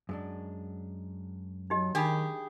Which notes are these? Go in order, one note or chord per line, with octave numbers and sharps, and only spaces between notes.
F#2 G#3 D4
F#3 D#4 G4 D#5
D#3 D4 D#4 G4 G#4 B5